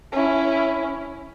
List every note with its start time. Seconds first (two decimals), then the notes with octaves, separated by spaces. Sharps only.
0.13 C#4 E4